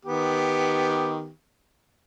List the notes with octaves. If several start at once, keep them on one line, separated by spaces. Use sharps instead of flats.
D#3 B3 G4